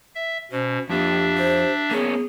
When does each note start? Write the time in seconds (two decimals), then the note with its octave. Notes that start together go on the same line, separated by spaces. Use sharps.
0.15 E5
0.51 B2 C#4 C5
0.89 F2 A#3 D4 G4 E5
1.37 C5
1.91 A#3 B3 C#4 G#4